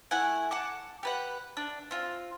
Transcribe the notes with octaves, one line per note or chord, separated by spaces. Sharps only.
A3 E4 F#5 G#5
F#5 A5 D6
G4 B4 F#5
D4
C4 F4